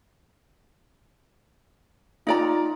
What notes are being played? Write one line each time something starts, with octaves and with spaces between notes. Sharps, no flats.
D#4 F4 D5 A#5